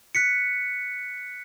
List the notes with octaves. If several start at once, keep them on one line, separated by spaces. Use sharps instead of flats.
F#6 B6 C#7